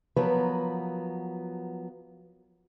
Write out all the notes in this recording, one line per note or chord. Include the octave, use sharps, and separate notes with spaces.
F3 F#3 B3 A#4 B4